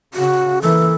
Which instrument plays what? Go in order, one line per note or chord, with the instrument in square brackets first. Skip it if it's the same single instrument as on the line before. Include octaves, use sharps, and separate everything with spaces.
[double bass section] C#3 [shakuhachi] F#4
[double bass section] E3 A#3 [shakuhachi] A4